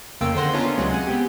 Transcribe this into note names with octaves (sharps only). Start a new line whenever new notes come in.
F2 C#3 A#3 F4 G5 E6
D3 D#3 C5 F#5 C6 A#6
B3 C#4 D4 F4 F5 A#5
C#2 C3 F#3 G#3
F#5 G#5
B3 C4 G4